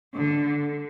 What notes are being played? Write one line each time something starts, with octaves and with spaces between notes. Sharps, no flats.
D3